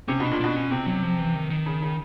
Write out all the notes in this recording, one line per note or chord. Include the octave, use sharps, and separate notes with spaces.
C3 C#4
B2 D4
A#2
B2 D4
C#4
C3 C4
F#3
F3
E3
D#3
D#3
C#3
C#3